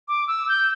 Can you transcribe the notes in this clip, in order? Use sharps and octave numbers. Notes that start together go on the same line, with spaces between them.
D6
E6
G6